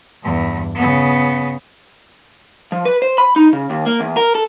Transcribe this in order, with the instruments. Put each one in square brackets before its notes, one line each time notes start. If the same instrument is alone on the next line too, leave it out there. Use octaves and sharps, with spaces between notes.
[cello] E2 G2
C#3 B3
[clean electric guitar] F3
B4
C5
B5
D#4
C#3
D#2
A#3
E2
A#4
A4